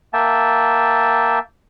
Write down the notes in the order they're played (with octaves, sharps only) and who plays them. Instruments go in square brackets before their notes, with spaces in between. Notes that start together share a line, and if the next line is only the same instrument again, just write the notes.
[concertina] A#3 E5 G5 A5